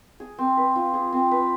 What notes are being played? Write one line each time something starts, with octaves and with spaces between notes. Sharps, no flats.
G#4
C4
B4
F4
G#4
C4
B4